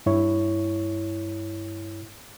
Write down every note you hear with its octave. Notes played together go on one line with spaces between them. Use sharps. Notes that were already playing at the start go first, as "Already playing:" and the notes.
G2 E4 C#5